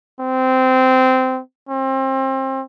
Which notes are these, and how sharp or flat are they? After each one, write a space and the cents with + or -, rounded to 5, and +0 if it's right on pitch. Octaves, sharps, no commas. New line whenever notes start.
C4 -15
C4 +30